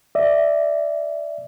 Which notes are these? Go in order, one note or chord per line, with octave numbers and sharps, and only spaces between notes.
D5 E5